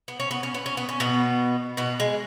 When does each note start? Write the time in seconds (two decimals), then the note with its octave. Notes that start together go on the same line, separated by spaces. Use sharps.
0.08 B3
0.20 C#4
0.31 B3
0.43 C#4
0.54 B3
0.66 C#4
0.77 B3
0.89 C#4
1.00 B2 B3
1.77 B2 B3
2.00 G#3